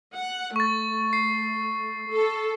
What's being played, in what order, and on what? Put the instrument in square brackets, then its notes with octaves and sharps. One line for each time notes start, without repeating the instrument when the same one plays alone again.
[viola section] F#5
[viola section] A3 [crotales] C#6 A6
[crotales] C7
[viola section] A4